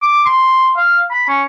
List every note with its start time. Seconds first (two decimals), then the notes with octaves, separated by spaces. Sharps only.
0.02 D6
0.26 C6
0.77 F5
1.11 B5
1.28 C#4